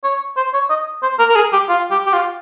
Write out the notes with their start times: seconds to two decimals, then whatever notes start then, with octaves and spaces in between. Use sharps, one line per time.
0.04 C#5
0.37 C5
0.54 C#5
0.70 D#5
1.03 C5
1.19 A#4
1.30 A#4
1.36 G#4
1.53 G4
1.69 F4
1.91 G4
2.06 G4
2.13 F4